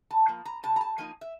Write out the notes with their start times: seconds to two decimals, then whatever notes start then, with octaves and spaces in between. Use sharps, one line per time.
0.11 A5
0.28 F3 A#3
0.45 A#5
0.63 C3 A5
0.76 A#5
0.81 A5
0.98 F3 A#3 D#4 G#5
1.21 E5